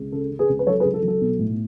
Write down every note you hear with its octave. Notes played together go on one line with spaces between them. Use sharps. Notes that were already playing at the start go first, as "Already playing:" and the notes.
Already playing: C#2
C#3 A4
C#3
G#4 B4
C#2
B4
F#3 A4 C#5
G#4 B4
C#2
A4
F#3
A4
B1
A2